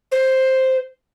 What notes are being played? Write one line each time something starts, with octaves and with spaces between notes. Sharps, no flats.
C5